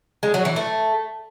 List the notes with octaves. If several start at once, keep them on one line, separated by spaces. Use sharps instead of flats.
G#3
F#3
E3
A3